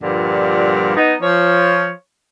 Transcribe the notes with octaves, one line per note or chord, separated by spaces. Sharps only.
G2 A#2 D3 F3 G3
B3 D#4
F3 C#5